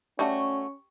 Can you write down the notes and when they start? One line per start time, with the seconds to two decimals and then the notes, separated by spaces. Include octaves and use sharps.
0.19 G3 A3 C#4 F#4 C#6